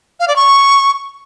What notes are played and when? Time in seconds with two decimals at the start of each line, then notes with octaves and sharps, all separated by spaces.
0.20 F5
0.28 D5
0.36 C#6